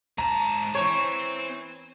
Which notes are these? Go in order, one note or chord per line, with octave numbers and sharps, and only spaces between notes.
G#2 A5 A#5
E3 C4 C5 C#5